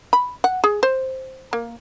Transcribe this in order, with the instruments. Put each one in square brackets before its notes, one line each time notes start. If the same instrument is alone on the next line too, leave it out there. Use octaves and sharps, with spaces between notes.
[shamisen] B5
F#5
G#4
C5
A#3